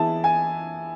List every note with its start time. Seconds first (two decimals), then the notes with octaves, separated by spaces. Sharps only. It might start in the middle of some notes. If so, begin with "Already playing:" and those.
Already playing: E3 B3 E4 G#4 A5
0.24 G#5